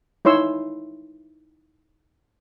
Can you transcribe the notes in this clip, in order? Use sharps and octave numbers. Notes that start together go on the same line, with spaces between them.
D#4 E4 C#5 C6 E6